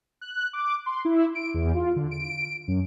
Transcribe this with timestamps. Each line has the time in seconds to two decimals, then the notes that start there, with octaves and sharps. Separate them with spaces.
0.21 F#6
0.53 D6
0.86 C6
1.05 E4
1.35 D7
1.54 E2
1.74 F4
1.96 D3
2.11 D7
2.68 F#2